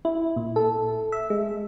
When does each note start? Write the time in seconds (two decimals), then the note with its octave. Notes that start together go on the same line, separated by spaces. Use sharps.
0.05 E4
0.36 A#2
0.56 A4
1.12 E5
1.30 G#3